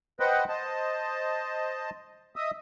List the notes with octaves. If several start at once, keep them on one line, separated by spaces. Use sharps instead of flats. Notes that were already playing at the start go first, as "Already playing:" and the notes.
B4 C5 D#5 F#5 G5
C5 D#5 A5
D#5 E5 D#6